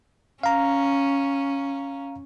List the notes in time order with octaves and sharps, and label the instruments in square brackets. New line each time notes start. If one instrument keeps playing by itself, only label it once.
[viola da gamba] C#4 [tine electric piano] F5 A#5